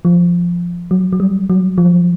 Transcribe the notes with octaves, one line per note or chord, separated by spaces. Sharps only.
F3
F#3
F#3
G3
F#3
F3